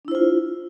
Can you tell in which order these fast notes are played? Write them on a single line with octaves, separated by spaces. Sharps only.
D4 E4 C5 F4